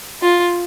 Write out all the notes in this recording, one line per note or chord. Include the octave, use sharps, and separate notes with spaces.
F4